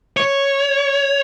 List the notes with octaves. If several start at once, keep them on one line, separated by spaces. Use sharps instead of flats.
C#5